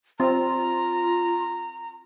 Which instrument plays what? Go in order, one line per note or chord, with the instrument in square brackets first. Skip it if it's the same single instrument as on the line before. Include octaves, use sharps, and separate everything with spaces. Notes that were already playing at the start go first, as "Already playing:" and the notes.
[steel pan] C4 [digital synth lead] F4 [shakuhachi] A#5